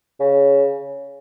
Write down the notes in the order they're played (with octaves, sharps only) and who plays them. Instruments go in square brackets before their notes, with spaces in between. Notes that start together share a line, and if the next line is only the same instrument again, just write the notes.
[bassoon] C#3